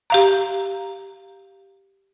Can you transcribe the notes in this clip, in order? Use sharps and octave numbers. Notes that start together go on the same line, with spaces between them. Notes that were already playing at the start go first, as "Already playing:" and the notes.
G4 F5 A#5